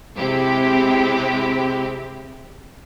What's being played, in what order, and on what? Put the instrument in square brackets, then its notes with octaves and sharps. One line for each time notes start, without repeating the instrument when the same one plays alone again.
[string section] C3 G#3 C4 E4 G4